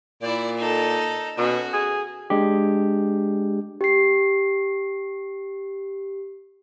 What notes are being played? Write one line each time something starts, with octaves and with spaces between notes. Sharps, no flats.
A#2 E4 D5
D#4 A4
B2 C#4 F#4
G#4
G#3 D4 G4
G4 C7